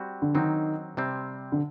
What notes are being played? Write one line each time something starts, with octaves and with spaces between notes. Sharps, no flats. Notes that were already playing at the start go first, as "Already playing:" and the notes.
Already playing: G3 C4 F#4
D3
D#3 F#3 C4 D#4
C3 G3 C4
D3